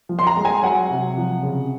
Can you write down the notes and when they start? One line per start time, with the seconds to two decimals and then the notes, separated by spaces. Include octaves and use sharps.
0.09 F3
0.19 C6
0.27 A#5
0.37 G#3
0.45 G#5
0.63 F#3 F#5
0.90 C3
1.17 F3
1.43 C#3